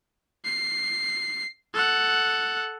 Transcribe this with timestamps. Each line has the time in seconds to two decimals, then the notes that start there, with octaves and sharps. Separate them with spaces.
0.45 C7
1.74 A4 F#5